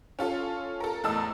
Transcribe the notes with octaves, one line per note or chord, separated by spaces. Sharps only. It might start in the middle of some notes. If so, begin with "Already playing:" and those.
C#4 F4 A4
A4 A#4
E2 A2 D#5 A5 E6